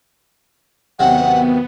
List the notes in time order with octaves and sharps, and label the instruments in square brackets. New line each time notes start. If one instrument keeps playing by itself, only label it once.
[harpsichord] D#2 C3 F#3 [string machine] B3 [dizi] F#5